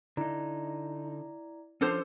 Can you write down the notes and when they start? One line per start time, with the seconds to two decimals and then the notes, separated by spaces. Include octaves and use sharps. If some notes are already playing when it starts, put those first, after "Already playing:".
0.17 D3 D#4 E4 D5 A#5
1.81 F3 C#4 D4 A4 C5